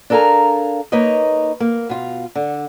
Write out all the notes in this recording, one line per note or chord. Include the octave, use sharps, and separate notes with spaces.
D4 A4 A#4 F5 G#5 A#5
A#3 D#4 B4 C#5 D#5
A#3
B2 F4
D3